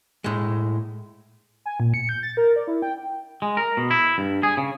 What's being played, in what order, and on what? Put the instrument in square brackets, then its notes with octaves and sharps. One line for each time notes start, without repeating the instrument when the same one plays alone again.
[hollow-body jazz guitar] A2 G#3
[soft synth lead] G#5
A#2
C#7
G6
A6
A#4
D5
E4
G5
[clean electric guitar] G#3
A#4
B2
E4
G2
G#4
C#3